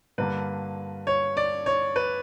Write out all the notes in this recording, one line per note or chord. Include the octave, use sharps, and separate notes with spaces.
G2 D3 A#3 B4
C#5
D5
C#5
B4